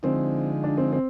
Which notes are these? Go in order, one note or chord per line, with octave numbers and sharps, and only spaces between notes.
D3 F3 G#3 C4 D#4
D4
C4
C4